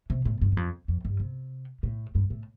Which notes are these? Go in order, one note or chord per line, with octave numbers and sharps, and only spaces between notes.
C3
A2
G2
G2
F2
F2
G2
C3
A2
G2
A2